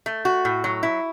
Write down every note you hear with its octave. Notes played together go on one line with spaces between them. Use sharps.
A3
F#4
A2
F#3
E4